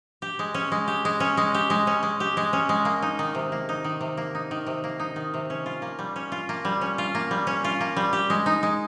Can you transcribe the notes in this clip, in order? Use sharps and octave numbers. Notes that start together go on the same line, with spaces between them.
G4
G#3
C#4
G#3
G4
G#3
C#4
G#3
G4
G#3
C#4
G#3
G4
G#3
C#4
G#3
A#3
D#4
D#3
C3
A#3
D#4
D#3
C3
A#3
D#4
D#3
C3
A#3
D#4
D#3
C3
C#4
F4
A#3
G3
C#4
F4
A#3
G3
C#4
F4
A#3
G3
C#4
F4
A#3
G3
G4
G#3
D#4
G#3